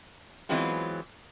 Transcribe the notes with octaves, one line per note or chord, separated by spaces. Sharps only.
E3 F#3 G#3 B3 C4 F4